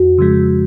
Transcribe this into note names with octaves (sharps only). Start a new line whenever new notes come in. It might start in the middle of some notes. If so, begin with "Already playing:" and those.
Already playing: F2 F#4
C#3 F3 G#3